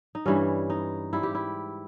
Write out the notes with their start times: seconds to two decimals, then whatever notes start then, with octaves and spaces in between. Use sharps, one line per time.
0.15 D#4
0.26 G2 E3 G3 C#4
0.70 D#4
1.13 G#2 G3 E4
1.23 G4
1.35 E4